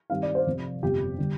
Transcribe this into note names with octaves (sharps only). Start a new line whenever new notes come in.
G2 D#3 G3 C4 F5
D5
C5
F1 F2 C3
G1 F2 C3 F3 G4
D3 G3